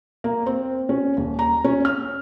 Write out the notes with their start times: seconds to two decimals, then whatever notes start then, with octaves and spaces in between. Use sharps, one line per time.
0.24 A#3
0.46 C4
0.89 C#4
1.17 D#1
1.39 A#5
1.64 C#4
1.85 F6